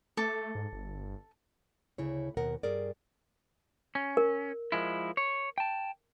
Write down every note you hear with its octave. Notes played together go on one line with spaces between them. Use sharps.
A3 A4 D6
G#2
G1
D2 C#3 E4 C#5
D#2 B2 A#4 F#5
G2 G#4 A#4 D5
C#4
A#4
F3 G#3 E4
C#5
G5 A5